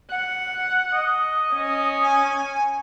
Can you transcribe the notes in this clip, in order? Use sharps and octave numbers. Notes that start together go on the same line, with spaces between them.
F#5
D#5
C#4
G#5